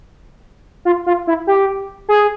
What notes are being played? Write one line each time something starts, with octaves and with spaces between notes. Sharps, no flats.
F4
F4
E4
G4
G#4